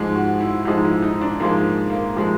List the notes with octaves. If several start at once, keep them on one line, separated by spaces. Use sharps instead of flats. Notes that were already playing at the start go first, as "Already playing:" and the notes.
Already playing: G#2 F3 G#3
F#4
E4
G#2 F3 G#3 D#4
E4
D#4
D4
G#2 F3 G#3 A#3
A#3
F3 G#3